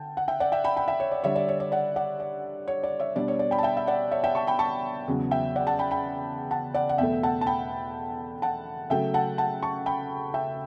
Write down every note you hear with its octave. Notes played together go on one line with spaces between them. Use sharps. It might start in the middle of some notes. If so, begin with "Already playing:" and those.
Already playing: D3 G5 A5
F#5
E5 G5
D5 F#5
E5 G5
G5 B5
G5 B5
E5 G5
C#5
D5
D3 G3 D4 C#5 E5
D5
C#5
D5
D5 F#5
D5 F#5
D5
C#5
D5
C#5 E5
B2 G3 D4 D5
C#5
D5
G5 B5
A5
E5 G5
E5
D5 F#5
C#5 E5
E5 G5
A5 C#6
G5 B5
A5 C#6
E2 C#3 F#3 B3
E5 G5
D5 F#5
F#5 A5
G5 B5
G5 B5
F#5 A5
D5 F#5
F#5
E2 B2 A3 E5 G5
F#5 A5
A5
G5 B5
F#5 A5
C#3 F#3 A3 E5 G5
F#5 A5
F#5 A5
A5 C#6
G5 B5
E5 G5